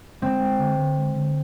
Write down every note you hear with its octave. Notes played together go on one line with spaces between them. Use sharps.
G#3 C4
G#3
D3
D3
G#3
D3